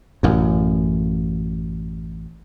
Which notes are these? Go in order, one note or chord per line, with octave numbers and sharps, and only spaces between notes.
A1 F#2